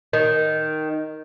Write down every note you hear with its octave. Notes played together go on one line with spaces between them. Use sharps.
D#3